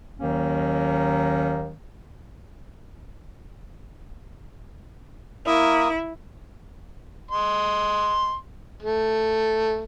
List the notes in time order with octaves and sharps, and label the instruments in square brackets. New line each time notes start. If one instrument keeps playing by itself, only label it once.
[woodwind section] D#2 D#3 F#3 A#3 C#4
[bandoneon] A#3 A#4 D#6 [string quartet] E4
[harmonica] D#5 C6
A3